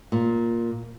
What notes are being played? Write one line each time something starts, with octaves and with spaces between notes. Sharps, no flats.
A#2